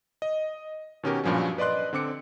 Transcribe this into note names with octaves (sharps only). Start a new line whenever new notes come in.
D#5
B2 D#3 C#4 F#4 G4 A#4
G2 A#2 F3 F#3 C#4
B4 D5 D#5 C6 F#6
D3 C4 D6 C#7